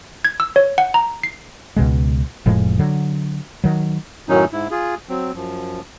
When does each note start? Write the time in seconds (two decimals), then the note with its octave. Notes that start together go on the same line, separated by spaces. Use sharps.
0.25 G#6
0.40 E6
0.56 C#5
0.78 F#5
0.94 A#5
1.23 C7
1.77 C#2 B2 G#3
2.46 F1 A2 F3 G#3
2.79 D3 F#3
3.64 D#3 F#3
4.29 F#2 A2 D#3 F#3 C#4 D#4
4.52 G#2 E4
4.71 F4 G#4
5.09 F#3 C4
5.35 F#2 F3